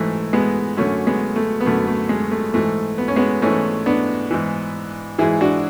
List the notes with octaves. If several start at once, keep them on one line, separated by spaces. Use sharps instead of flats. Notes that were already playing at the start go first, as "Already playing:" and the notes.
Already playing: G#2 E3 A3
G#3 B3
F#2 D3 A3 C#4
G#3 B3
A3
B3
F#2 D3 A3
A3
G#3
A3
G#2 E3 A3
B3
C#4
G#3 B3
G#2 E3 A3 C#4
B3 D4
G#2 E3
G#2 E3 E4 G#4
D4 F#4